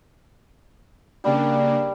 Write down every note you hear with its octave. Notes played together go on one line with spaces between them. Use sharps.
C#3 G3 A#3 D4